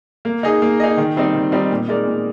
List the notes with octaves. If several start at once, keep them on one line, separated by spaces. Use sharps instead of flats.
A#3
D#4 G#4 D#5
A#3
D#4 G#4 D#5
D#3
G3 C4 D#4
D#3
G3 C4 D#4
A#2
G#3 D#4 A#4 D5
A#2